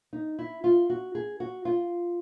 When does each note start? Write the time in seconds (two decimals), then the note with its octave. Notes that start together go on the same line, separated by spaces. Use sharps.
0.13 D#4
0.39 E4
0.64 F4
0.90 F#4
1.15 G#4
1.40 F#4
1.65 F4